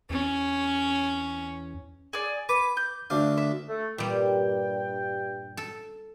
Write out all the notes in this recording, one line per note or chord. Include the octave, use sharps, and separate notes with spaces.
E2 C#4
G#4 D5
B4 D6
G6
D2 D4 F5
E5
A3
G2 A#2 G3 G5
A4